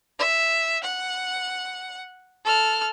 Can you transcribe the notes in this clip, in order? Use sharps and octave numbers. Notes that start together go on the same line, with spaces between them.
E5
F#5
A4 F6